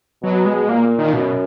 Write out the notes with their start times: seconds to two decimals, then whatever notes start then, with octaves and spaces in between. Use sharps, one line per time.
0.23 B2 F#3
0.46 G#3
0.69 A#2 A#3
0.98 D#3
1.13 F#2 B2